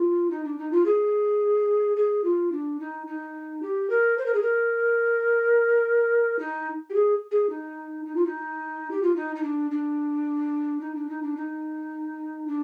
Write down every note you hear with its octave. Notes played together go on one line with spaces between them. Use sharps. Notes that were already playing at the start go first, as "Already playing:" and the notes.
Already playing: F4
D#4
D4
D#4
F4
G#4
G#4
F4
D4
D#4
D#4
G4
A#4
C5
A#4
G#4
A#4
D#4
G4
G#4
G#4
D#4
D#4
F4
D#4
G4
F4
D#4
D#4
D4
D4
D#4
D4
D#4
D4
D#4
D4